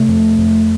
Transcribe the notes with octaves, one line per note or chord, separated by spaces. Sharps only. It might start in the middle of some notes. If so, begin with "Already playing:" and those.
Already playing: C3 A3
F2
F2